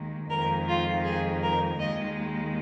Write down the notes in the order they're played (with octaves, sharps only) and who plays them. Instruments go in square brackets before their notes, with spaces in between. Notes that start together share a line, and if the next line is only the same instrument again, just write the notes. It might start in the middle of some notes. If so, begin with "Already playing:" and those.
Already playing: [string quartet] D#2 D#3 G#3
F2 D#3 G#3 A#4
F4
G#4
A#4
D#2 D#3 G#3 D#5